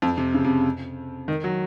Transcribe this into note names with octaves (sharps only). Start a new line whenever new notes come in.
F2
C3
C#3
C3
D#3
F#3